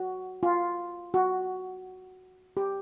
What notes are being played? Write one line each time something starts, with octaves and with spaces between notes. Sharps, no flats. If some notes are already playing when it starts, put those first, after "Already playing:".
Already playing: F#4
F4
F#4
G4